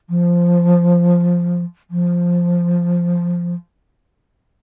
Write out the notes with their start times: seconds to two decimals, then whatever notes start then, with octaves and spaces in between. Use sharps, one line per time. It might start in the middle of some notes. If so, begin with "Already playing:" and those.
0.09 F3
1.90 F3